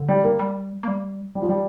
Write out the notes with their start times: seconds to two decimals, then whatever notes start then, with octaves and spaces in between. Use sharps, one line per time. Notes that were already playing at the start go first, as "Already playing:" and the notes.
Already playing: D3
0.08 G3
0.24 A#3
0.39 G3
0.83 A#3
0.88 G3
1.35 G3
1.42 F3
1.49 G3